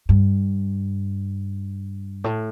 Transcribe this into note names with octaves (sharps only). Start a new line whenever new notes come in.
G2
A2